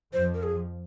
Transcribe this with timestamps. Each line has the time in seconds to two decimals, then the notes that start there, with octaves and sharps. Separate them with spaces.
0.13 F2 F3 C5
0.34 A#4
0.43 G#4